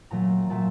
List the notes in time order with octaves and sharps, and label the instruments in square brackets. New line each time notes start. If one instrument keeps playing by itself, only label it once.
[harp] A#2 F#3 A3 A#5
A#2 F#3 A3 A5